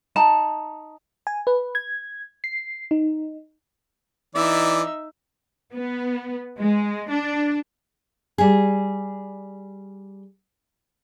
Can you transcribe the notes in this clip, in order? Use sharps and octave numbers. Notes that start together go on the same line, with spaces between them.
D#4 A5 A#5
G#5
B4
G#6
C7
D#4
E3 D#4 D5 E5
B3
G#3
D4
G3 G#4